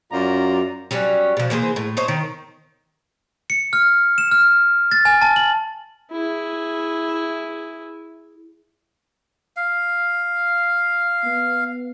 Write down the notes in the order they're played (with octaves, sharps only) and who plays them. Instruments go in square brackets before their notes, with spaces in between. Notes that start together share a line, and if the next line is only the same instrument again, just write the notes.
[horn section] F#2 F#3 F4 D5 A#5
[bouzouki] F#3 G3 C#4
B2 F3
E3 A#3 G#4 C5
A2
D#4 C5 C#5
D#3
[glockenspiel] C#7
F6
E7
F6
A6
G#5
A5
F#7
[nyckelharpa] E4 G#4
[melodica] F5
[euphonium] B3